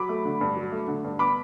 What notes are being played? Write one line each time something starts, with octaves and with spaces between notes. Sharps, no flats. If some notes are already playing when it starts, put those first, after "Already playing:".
Already playing: F#3 B5 D6
A3
D3
G2
F#3
A3
D3
G2
B3 B5 D6